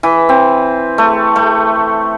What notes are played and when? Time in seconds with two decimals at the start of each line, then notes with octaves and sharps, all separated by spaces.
0.03 E3
0.29 C4
0.98 A3
1.36 A3